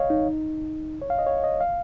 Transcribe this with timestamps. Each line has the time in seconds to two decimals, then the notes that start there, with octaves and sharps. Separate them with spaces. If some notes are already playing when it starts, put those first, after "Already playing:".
Already playing: C#5 D#5 F5
0.10 D#4
1.02 C#5
1.10 F5
1.19 D#5
1.26 C#5
1.44 D#5
1.61 F5